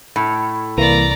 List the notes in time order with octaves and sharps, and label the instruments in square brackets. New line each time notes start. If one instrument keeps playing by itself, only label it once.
[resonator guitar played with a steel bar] A2
[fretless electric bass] C2 [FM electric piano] E3 A#3 [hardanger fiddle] D5 A#5